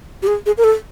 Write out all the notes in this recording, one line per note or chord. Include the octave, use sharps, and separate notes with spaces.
G4
G#4
G#4
A#4
A4